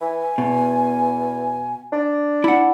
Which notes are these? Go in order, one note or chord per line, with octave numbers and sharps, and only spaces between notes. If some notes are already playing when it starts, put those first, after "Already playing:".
E3 G#5
E2 B2
D4
E4 F#5